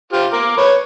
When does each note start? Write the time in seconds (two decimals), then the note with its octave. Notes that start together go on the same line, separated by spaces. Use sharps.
0.13 F4 G4 C5
0.33 A#4 D6
0.58 B4 C#5